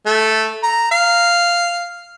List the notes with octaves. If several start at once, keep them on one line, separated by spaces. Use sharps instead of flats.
A3
A#5
F5